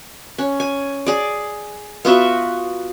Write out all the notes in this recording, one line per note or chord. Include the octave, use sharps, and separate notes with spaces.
C#4
G#5
G#4 D5
B3 F4 F#4 E5